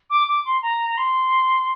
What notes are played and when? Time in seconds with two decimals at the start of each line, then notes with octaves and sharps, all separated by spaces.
0.10 D6
0.28 D6
0.45 C6
0.62 A#5
0.89 A#5
0.97 C6